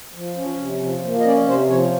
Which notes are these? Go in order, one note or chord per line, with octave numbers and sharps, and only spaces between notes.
F3
C#4
C3
F3
A#3
D#5
C#4 D5
C3 C5
F3 C#5